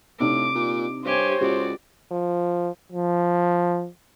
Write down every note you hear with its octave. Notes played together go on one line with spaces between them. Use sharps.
A2 C3 D4 D#4 D6
A#2
G2 G4 C5 C#5 G#5
C#2 F#4 G4 D5
F3
F3